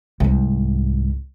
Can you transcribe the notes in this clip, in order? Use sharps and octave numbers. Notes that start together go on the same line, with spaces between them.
C2 G#2